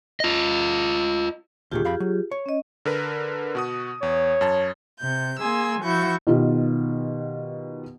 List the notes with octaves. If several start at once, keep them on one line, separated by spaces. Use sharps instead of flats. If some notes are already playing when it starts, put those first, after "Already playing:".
F4 D#5
D2 A#2 D#3 F4 G4 G#4
F2 F5 B5
F#3
C#5
C#4 D#5
D3 A#4 B4
B2 F#4 D#6
E2 C#5
F#2 A5
C3 G6
A#3 G#4 G#5 C6 E6
F3 E4 F#4 C#6 G6
B2 D#3 B3 F4 G4